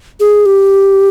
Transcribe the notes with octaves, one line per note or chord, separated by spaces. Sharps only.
G#4
G4